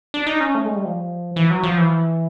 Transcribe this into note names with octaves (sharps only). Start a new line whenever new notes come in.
D4
D#4
C#4
A3
G#3
G3
F3
E3
F#3
F3
E3